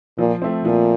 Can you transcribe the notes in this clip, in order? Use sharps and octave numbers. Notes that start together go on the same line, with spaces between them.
A#2 F3
A3 C4
A#2 F3